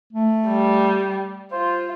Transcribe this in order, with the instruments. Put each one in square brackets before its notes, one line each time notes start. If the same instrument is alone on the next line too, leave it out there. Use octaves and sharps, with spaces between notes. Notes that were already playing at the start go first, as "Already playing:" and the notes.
[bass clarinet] A3
[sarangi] G3
[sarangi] F4 [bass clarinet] C5